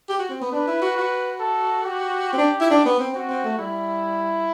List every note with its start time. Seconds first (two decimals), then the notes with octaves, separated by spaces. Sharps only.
0.09 G4
0.19 F#4
0.30 C4
0.42 B3
0.52 D4 B4
0.68 E4
0.82 F#4
0.97 F#4
1.40 A4
1.84 G4
2.33 C4
2.38 D4
2.61 E4
2.71 D4
2.86 B3
3.00 C4
3.15 C4 F#4
3.29 C4
3.44 A3
3.59 G3 E4